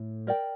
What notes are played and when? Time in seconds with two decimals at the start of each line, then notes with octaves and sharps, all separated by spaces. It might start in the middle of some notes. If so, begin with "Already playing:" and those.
Already playing: A2
0.27 A#4 D5 G5